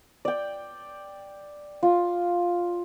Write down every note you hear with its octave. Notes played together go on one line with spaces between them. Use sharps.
D5 G5
F4